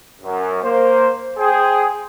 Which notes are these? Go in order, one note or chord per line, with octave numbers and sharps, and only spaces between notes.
F#2
A#3 C5
G#4 C5 G5